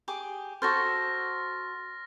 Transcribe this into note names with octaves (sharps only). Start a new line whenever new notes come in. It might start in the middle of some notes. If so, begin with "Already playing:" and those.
G4 G#4 D6
F#4 A4 C5 F6 A6 A#6